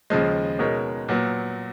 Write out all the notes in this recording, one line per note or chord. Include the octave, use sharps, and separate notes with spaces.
D#2 C#3 F3 G#3
B2 G#3 D#4 A#4 C#5
A#2 F#3 B3